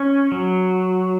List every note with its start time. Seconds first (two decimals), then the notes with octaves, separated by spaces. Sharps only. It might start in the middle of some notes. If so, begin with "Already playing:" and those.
Already playing: C#4
0.32 F#3